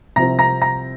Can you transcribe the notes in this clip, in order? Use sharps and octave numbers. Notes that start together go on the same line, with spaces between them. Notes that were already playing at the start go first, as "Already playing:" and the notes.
C2 C3 F3 C4 A#5 A#6
A#5 A#6
A#5 A#6